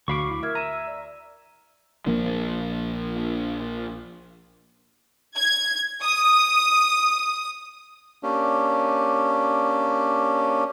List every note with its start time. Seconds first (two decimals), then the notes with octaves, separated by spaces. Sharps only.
0.08 D2 F#4 F5 B5 C#6 D6
0.29 E4
0.43 A#4 E5 F6 G#6
0.55 A#5 D#7 E7
0.73 E6
0.87 D5
2.07 A#1 F3 A#3 D4
5.36 G#6
6.02 D#6
8.23 A#3 C#4 D4 G4